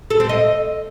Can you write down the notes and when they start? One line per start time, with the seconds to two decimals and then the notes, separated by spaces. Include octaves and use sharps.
0.10 A4
0.20 C4
0.29 D#5